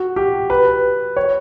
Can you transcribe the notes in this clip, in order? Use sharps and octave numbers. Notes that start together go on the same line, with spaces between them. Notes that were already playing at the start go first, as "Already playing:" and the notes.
Already playing: F#4
G4
B4
C#5